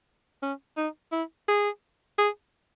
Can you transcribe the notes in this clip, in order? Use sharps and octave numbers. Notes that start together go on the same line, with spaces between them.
C#4
D#4
E4
G#4
G#4